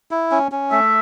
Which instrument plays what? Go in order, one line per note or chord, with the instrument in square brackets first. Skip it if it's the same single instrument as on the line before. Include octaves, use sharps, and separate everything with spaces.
[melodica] E4
C#4
C#4
[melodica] A3 [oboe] E5